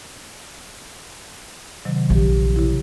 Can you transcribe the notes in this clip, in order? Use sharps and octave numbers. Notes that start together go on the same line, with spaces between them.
C3 D#3 F#3
A#1 C3 F3 G4
C#3 E4